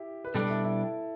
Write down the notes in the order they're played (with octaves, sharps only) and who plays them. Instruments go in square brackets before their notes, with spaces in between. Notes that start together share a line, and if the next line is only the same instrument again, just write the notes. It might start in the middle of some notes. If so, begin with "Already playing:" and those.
Already playing: [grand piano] E4 G4
B4
[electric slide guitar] B2 G3 D4 [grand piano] A4
[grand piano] E4
E4